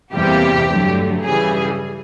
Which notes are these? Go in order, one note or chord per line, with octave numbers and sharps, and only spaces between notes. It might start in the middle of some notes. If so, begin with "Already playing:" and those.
E2 C3 E3 G3 A#3 G4
G2 D3 F#3 A3
C#3 E3 G3 G#4